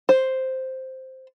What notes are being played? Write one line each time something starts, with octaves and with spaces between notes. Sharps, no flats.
C5